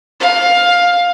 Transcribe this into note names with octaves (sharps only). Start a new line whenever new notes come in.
F5